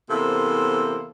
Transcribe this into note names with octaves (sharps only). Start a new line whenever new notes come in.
E2 C3 A#3 A4 C5